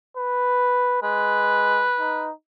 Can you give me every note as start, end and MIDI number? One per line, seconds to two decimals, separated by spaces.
0.17 1.02 71
1.03 1.86 56
1.03 2.28 71
1.99 2.32 63